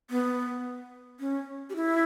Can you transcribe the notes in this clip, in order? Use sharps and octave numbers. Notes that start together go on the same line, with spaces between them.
B3
C#4
G4
E4